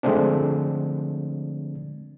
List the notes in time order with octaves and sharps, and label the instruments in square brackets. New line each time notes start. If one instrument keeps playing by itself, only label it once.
[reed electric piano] D3 F3 G#3 A3 C4 D4